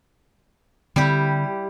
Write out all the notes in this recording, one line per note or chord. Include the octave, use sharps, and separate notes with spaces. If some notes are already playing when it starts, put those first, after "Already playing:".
D3 G3 C4 E4 G4